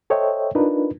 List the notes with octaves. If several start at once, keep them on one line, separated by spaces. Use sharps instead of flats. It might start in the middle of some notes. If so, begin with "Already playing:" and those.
A4 C5 C#5 D#5 E5 G5
D4 D#4 F4 A#4 B4